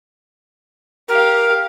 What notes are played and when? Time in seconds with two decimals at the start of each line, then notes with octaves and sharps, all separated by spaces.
1.08 G4 A#4 F5